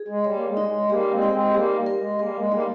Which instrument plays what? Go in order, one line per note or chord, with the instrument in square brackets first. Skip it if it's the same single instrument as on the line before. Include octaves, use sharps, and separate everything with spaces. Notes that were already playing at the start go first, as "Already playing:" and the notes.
Already playing: [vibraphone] G#4
[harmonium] G#3
[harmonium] G3 [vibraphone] C#5
[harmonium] A#3
G#3
[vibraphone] D#4
[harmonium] G#3
[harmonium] G3 A#3 [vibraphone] G4
[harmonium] G#3 C4
[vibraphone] D#4
[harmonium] G#3 C4
[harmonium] G3 A#3 [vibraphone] G4
[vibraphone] A#4
[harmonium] G#3
[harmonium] G3 A#3 [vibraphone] A#4
[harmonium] G#3
[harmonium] G3 A#3 [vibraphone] D#4